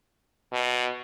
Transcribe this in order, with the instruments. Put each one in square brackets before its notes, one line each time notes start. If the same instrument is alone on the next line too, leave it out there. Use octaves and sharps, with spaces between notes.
[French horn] B2